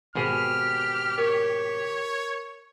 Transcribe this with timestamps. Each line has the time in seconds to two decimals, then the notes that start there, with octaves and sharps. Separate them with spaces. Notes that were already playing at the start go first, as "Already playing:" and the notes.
0.15 G#1 B2 G4 G#4 F6
1.18 A#4 C#5